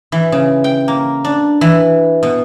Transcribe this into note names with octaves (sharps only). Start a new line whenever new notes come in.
E3
C#3
G5
A#3
D4
E3
B2